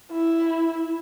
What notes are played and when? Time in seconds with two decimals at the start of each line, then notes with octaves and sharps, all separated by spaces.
0.12 E4